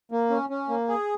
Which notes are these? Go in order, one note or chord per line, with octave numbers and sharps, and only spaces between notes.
A#3
C#4
C#4
A#3
G#4